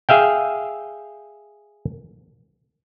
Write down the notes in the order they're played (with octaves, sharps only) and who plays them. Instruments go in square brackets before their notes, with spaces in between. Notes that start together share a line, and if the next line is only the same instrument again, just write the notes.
[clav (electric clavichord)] G#4 E5 F5 G5